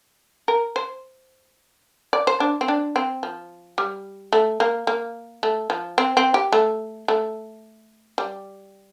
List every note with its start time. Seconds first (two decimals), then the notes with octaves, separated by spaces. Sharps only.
0.48 A#4
0.76 C5
2.13 D5
2.27 C5
2.40 D4
2.61 C4
2.68 D4
2.96 C4
3.23 F3
3.78 G3
4.33 A3
4.60 A#3
4.87 A#3
5.43 A3
5.70 F3
5.98 C4
6.17 C4
6.34 G4
6.53 A3
7.08 A3
8.18 G3